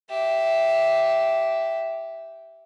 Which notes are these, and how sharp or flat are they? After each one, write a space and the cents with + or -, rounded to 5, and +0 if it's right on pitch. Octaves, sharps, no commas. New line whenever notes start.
G4 -10 E5 +0